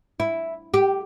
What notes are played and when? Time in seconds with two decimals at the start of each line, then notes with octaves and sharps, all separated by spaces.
0.20 E4
0.74 G4